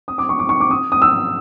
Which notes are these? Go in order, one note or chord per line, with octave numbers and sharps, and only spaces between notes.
D#6
D6
C#6
D6
C#6
D6
D#6
D#6
E6